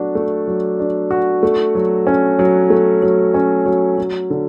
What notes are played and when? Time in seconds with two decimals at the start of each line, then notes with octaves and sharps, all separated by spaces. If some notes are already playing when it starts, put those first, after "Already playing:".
Already playing: F#3 A3 D4 F#4
0.15 A3
0.48 F#3
0.79 D4
1.11 F#4
1.43 A3
1.75 F#3
2.07 C#4
2.39 F#3
2.70 A3
3.03 F#3
3.34 C#4
3.66 F#3
3.98 F#3
4.30 D3